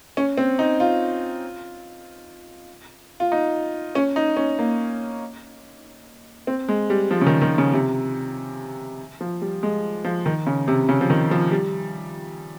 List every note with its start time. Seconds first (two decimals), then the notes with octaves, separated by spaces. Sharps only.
0.17 C#4
0.38 C4
0.59 D#4
0.80 F4
3.20 F4
3.32 D#4
3.95 C#4
4.16 D#4
4.37 C#4
4.59 A#3
6.47 C4
6.69 G#3
6.90 G3
7.11 F3
7.21 C#3
7.26 D#3
7.42 D#3
7.58 C#3
7.73 C3
9.21 F3
9.42 G3
9.63 G#3
10.04 F3
10.26 D#3
10.47 C#3
10.68 C3
10.89 C#3
11.01 F3
11.10 D#3
11.31 F3
11.52 G3